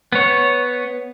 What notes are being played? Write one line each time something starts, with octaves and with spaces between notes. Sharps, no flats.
B3 C#5